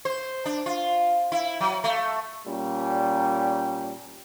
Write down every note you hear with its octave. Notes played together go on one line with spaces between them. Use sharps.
C5
D4
F4
E4
F#3
A3
A#2 G3 C#4